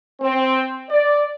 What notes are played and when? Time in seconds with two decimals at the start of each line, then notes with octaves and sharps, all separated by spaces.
0.20 C4
0.89 D5